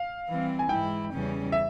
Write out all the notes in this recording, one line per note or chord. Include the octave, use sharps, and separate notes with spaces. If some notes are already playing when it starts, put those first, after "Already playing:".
Already playing: F5
E3 G3 C4
G#5
G#2 E3 G#3 E4 G5
E2 C#3 E3 G3 C#4
E5